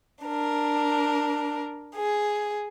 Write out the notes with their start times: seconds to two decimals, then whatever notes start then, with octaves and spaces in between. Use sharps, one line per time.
0.23 D4 A#4
1.95 G#4